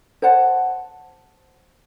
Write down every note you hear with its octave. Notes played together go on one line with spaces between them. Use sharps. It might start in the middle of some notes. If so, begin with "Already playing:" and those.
C5 C#5 F#5 A5